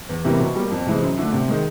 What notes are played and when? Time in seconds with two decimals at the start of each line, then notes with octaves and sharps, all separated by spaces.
0.09 E2
0.24 C3 E3 G3 A#3
0.40 B2
0.56 G3 A#3
0.71 F2
0.86 C3 E3 G#3 C4
1.02 F#2
1.17 D3 F3 A3 D4
1.33 C3
1.48 D#3 G#3